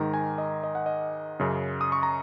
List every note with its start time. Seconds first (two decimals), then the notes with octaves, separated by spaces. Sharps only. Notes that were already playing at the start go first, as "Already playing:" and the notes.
Already playing: G#2 D#3 A#5
0.14 G#5
0.38 D#5
0.64 D#5
0.75 F#5
0.86 D#5
1.40 F#2 C#3
1.81 D#6
1.92 C#6
2.03 A#5